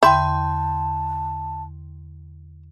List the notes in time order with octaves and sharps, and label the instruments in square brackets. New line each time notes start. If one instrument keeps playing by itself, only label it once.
[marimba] E2 D3 [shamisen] E4 [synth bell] G5 C6 G6 [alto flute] A5